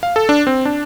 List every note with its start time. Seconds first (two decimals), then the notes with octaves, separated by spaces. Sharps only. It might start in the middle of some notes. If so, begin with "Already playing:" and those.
0.03 F5
0.16 A4
0.29 D4
0.47 C4
0.65 D4